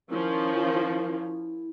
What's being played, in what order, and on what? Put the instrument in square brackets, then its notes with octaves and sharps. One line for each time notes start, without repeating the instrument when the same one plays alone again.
[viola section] D#3 F3 C#4 [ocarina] E4